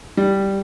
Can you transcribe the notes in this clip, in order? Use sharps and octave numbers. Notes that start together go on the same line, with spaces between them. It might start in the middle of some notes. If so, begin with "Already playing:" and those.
G3